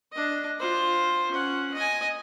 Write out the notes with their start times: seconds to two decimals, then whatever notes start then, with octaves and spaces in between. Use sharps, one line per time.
0.13 D4 D#5
0.60 F4 C5
1.31 C#4 F#5
1.74 D#5 G#5